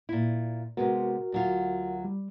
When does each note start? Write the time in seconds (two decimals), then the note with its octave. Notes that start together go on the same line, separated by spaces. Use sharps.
0.09 A#2 E4
0.77 C3 G#3 B3 F#4 A#4
1.32 D2 F#3 F4
2.05 G3